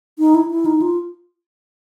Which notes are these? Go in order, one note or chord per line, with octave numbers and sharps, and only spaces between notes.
D#4
E4
E4
D#4
F4